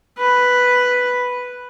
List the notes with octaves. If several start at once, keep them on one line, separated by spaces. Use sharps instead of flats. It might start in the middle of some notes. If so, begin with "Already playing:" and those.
B4